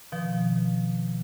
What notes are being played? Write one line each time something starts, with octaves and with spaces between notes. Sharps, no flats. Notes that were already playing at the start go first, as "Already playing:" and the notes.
B2 D#3 F3